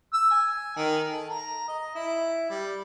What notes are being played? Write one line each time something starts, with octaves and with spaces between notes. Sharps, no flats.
E6
G#5
D#3
A4
A#5
D#5
E4
G3